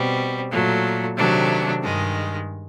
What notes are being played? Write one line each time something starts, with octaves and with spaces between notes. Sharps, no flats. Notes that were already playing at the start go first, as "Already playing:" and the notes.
Already playing: B2 G3 C4
A#2 F#3 A3
C3 D#3 F#3 A3 D4
G2 D#3 G#3